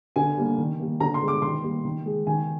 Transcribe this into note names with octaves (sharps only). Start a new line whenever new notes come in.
D3 G#5
G3 A#3
D#3
G3 A#3
D3 A#5
C6
G#3
D6
D#3 C6
G3 A#3
D#3
G#3
D#3 G#5